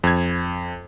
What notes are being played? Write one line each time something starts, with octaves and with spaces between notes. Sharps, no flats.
F2 G#6